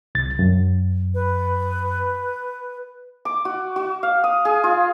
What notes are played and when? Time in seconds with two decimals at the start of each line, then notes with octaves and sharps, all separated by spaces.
0.15 C2 A6
0.39 F#2
1.14 B4
3.25 D6
3.45 F#4
3.76 F#4
4.03 F5
4.24 D#6
4.45 G#4
4.64 F4